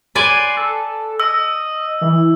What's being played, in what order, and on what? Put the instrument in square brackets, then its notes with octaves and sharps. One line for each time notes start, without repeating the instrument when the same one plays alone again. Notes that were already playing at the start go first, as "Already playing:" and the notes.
[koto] B4 D5 G#5 [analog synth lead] C6
[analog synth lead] A4
[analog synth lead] D#5 [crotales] E6
[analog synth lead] E3